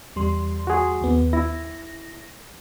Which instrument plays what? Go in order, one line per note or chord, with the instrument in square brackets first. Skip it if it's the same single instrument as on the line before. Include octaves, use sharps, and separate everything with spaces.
[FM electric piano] E2 G3 C6
[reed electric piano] F#4 G#4
[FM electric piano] D#2 B3
[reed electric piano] E4 [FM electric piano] A#6